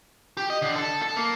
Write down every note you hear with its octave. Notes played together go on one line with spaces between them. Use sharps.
G4
D#5
D3
A4
A4
A#3